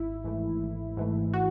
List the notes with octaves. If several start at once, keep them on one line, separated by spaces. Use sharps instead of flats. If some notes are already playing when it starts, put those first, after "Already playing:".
Already playing: G#1 E4
G#2 E3 A3
G#1
G#2 E3 A3
F#4